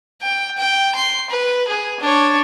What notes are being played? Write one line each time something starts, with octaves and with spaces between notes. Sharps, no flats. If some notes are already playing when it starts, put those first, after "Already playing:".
G5
G5
C6
B4
G#4
D4 C#5